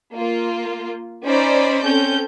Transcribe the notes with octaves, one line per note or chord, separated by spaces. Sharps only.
A#3 F4
C#4 D#4 C5 D5 B5
C4 C#4 A4 G6